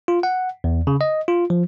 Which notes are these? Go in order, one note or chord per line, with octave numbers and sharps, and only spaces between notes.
F4
F#5
E2
C#3
D#5
F4
F3